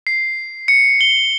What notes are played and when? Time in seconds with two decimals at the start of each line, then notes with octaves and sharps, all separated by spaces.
0.07 C7
0.68 C#7
1.01 G7